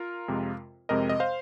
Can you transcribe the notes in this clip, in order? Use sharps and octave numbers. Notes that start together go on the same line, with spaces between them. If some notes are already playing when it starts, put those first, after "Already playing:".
Already playing: F4 A#4
F2 C3 G#3
F2 C3 G#3 C4 A#4 D#5
D#5
C5 F5